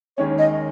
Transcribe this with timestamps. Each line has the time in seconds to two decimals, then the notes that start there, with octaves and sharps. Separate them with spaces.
0.17 D#2 D#3 G#3 C#4 C#5
0.38 D#5